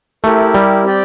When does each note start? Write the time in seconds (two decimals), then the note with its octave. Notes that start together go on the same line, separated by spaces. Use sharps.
0.24 A3 E4 G4 A#4
0.54 G3
0.84 C4 G4 D5 G5